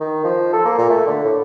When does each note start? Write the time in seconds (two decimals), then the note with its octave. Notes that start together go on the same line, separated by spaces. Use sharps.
0.01 D#3
0.24 F3
0.53 A4
0.65 A#3
0.78 A#2
0.90 A3
1.07 D3
1.24 A2